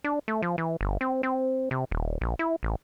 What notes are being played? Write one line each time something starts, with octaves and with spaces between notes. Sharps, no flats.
D4
A3
F3
E3
G1
C4
C4
C3
D#1
A#1
E4
A1